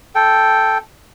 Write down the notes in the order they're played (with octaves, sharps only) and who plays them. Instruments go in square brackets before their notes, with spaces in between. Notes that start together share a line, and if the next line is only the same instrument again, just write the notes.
[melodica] A4 G5